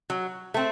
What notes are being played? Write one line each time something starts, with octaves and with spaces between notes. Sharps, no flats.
F#3
A3 C4